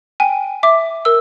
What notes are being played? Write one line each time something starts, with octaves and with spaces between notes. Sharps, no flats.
G5 G#5
E5 D6
A#4 E6